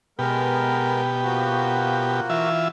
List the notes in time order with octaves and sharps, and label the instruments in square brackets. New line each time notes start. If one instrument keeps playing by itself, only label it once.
[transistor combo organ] B2 G4 [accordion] G#3 B3 A#4
[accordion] F3 A#3 F#4
[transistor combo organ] E3 F4 E5